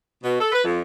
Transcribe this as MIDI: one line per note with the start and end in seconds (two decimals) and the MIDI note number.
0.23 0.38 47
0.41 0.50 69
0.52 0.61 71
0.64 0.80 41